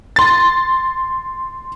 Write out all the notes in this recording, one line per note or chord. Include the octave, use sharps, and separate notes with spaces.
C6 A6